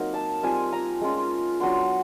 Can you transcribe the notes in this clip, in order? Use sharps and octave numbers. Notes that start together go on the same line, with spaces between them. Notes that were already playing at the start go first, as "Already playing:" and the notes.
Already playing: F#3 A#3 C4 D#4
A5
G3 C4 F4 G#5
A#5
G#3 C#4 F4
F#3 B3 D4 C6